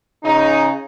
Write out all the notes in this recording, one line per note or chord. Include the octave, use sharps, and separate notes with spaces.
C#3 D#4